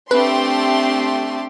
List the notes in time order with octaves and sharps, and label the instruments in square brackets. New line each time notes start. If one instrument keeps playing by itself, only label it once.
[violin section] A3 G4 C6 [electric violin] C4 D4 [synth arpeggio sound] B4